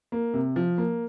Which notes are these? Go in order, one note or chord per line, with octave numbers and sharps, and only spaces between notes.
A#3
C3
F3
A#3